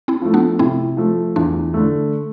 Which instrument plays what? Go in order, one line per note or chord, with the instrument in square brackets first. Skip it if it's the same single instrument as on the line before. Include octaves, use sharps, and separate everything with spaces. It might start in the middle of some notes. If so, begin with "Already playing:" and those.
[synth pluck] C4 E4
[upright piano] F3 A3
[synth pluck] B3 D4
[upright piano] C3 [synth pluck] C4 E4
[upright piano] F3 A3
[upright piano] E2 [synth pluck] D4 F4
[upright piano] D3 A3